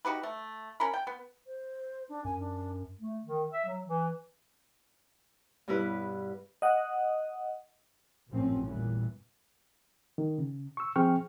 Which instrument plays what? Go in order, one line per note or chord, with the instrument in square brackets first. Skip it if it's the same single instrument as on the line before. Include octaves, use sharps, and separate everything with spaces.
[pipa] D#4 F#4 G4 B4
A3
C#4 A#4 B5
G5
B3
[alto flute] C5
D4
[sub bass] F#2 [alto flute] G#5
[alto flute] D4
[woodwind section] A3
D#3
E5
F#3
E3
[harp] G2 B2 E4 B4
[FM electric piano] D#5 F#5
[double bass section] A1 F#2 A#2 F3 C4 C#4
E2 A#2 E3 G3
[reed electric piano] D#3
C#3
C#6 E6
F3 C4 G#4 G5 C#6 F6